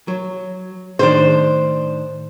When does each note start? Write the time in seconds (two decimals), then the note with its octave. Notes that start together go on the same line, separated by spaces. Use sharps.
0.08 F#3
0.99 A2 D#3 D4 C5